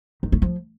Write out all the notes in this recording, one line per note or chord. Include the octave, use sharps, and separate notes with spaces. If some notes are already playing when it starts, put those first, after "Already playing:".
D#3
A3
F3